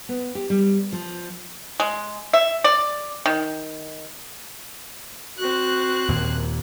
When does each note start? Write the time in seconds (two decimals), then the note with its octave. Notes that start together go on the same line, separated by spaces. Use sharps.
0.09 B3
0.35 G4
0.50 G3
0.92 F3
1.80 G#3
2.33 E5
2.64 D5
3.26 D#3
5.38 C4 F#4 F#6
6.08 D#2 A#2 A#3